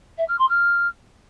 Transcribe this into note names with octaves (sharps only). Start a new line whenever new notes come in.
E5
F6
C6
F6